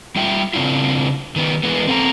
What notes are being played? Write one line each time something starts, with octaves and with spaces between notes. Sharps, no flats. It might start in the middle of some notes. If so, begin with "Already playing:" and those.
G3 F4 E5 G5
C#3 C4 D4 E4 F4
D#3 B3 D#4
E3 G#3 B3
C4 A4 F#5 A#5